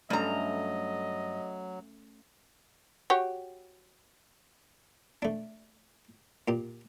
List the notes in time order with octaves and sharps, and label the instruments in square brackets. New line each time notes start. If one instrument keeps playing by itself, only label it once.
[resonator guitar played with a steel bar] G2 A#5 [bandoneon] F#3 [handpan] A3 C#4 [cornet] D#5
[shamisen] F#4 G4 C#5
[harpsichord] A3 D4
A#2 G4